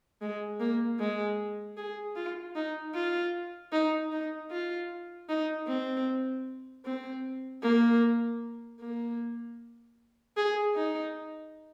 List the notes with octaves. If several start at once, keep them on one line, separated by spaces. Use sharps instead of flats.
G#3
A#3
G#3
G#4
F4
D#4
F4
D#4
D#4
F4
D#4
C4
C4
A#3
A#3
G#4
D#4